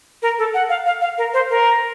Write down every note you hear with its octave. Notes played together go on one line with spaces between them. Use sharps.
A#4
A4
F#5
F5
F5
F5
A#4
C5
A#4